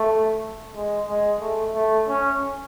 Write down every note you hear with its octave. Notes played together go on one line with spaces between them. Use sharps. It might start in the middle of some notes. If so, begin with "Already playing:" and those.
Already playing: A3
G#3
G#3
A3
A3
C#4